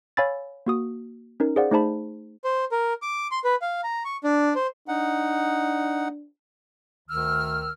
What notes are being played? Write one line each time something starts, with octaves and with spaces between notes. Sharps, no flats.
C#5 F5 G#5 B5 E6 A6
A#3 F#4 D#6
C#4 D#4 A#4
G#4 C5 D5 F5 F#5
A3 D#4 G#4 C5 A5 B5
C5
A#4
D6
C6
B4
F5
A#5
C#6
D4
C5
D4 D#4 F#5
D2 D#3 E6 F6